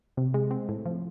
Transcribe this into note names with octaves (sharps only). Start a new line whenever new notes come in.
C3
G#3
C4
A2
F3